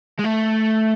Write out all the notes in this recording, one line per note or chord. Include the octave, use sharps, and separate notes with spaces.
G#3
A3